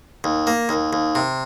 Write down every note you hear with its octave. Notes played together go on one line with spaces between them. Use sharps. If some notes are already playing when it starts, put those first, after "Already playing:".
D#2
A#3
D#2
D#2
C3